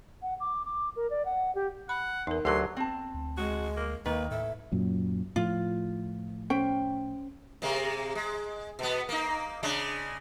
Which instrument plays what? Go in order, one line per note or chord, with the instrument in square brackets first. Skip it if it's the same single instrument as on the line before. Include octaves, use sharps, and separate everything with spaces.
[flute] F#5
D6
D6
A#4
D5
F#5
G4
[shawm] F#5 [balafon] B5
[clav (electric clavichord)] E2 [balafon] D#4 A#4
[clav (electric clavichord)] D2 D3 F#3 [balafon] G4 A#4 [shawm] C6
[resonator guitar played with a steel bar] C4 A5
[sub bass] D2
[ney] G#3 [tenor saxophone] F#4
[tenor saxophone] A#3
[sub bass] D#2 [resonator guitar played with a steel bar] D#3 [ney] A#3 [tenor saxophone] B4
[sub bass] A2 [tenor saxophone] A4 [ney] E5
[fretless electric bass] F#2 A#2 F#3
[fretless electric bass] A2 F3 [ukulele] F4
[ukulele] C#4 C5 G5
[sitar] C3 G#3 A#3
G#3
B2 B3
A#3 D#4
C#3 G#3 D4